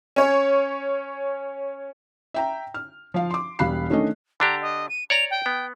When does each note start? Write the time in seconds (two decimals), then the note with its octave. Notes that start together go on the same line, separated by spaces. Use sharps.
0.16 C#4 C#5
2.34 E5 G5 A#5
2.74 F6
3.14 F3 F5
3.31 C6 D6
3.59 E1 G3 F5 B5 F#6 C7
3.90 D#3 A3 C#4 D4 D#5
4.40 D3 D4 G4 A#5
4.61 D#5
4.89 D#7
5.10 C#5 D5 A#5 F7
5.31 G5
5.46 B3